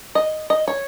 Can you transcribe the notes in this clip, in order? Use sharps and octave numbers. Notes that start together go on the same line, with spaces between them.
D#5
D#5
C#5